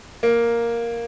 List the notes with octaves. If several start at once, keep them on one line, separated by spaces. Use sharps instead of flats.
A#3